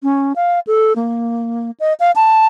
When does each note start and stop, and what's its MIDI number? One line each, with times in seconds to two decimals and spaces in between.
0.03 0.33 61
0.36 0.59 77
0.67 0.93 69
0.96 1.71 58
1.80 1.93 75
2.00 2.11 77
2.16 2.47 81